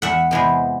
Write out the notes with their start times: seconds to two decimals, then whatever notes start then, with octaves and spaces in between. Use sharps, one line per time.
0.02 E2 E5 F#5
0.31 C3 E3 G#3 B3